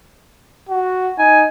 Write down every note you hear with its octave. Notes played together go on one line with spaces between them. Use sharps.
F#4
D#4 G#5